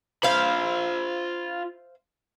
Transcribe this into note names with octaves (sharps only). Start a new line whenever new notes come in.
F4 C5 E5 F5 B5